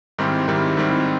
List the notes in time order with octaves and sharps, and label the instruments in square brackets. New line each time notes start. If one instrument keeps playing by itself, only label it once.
[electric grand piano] G#2 D#3 G3 C4 E4
G#2 D#3 G3 C4 E4
G#2 D#3 G3 C4 E4